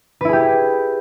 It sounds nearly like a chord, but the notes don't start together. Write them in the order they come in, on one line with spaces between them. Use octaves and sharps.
B4 E4 G#4 G4